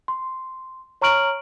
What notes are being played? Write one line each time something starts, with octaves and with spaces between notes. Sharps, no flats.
C6
C#5 A#5 C#6 F6 D7 F#7